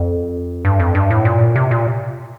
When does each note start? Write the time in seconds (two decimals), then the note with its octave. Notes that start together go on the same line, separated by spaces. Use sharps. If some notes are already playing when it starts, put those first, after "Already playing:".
Already playing: F2
0.65 G2
0.80 F2
0.95 G2
1.10 A2
1.25 A#2
1.56 C3
1.71 A#2